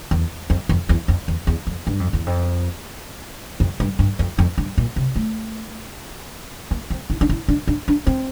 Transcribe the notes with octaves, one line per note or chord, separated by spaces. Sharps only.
E2
F2
F2
E2
F2
E2
E2
F2
G2
F2
E2
F2
F2
G2
G2
F2
F2
G2
A#2
C3
A3
A#3
C4
E4
D4
E4
D4
D4
D4
C4